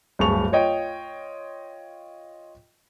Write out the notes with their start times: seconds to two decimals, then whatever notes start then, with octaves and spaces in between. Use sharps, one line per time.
0.19 D1 G2 G#4 A5 C#6 F7
0.52 F4 C#5 D#5 G5